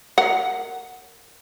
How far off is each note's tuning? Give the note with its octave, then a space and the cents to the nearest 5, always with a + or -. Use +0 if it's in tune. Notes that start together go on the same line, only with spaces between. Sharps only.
A#4 -10 F#5 +0